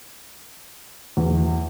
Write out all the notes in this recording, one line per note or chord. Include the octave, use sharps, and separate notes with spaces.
E2